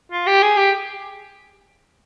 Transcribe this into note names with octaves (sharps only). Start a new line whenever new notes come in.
F4
G4
G#4
G4